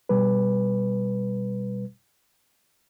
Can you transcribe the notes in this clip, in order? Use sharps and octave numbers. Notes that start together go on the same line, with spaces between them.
B2 G3 B4